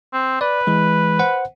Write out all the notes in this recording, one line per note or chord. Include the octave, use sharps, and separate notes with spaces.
C4
B4 D5
E3 G#3
C5 F#5